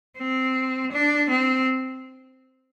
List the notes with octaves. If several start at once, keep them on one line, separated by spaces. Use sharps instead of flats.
C4
D4
C4